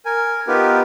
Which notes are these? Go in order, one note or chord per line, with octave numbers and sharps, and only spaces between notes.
A#4 G#5
B3 D#4 F4 G4 A#4 B4